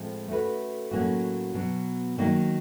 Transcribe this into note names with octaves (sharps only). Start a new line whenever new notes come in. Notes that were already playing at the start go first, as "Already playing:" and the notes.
Already playing: A2 F3 G#3 C4
A3 C#4 F#4 B4
A2 F#3 A#3 C#4 F#4
B2 F#3 B3
D#3 F#3 A#3 D#4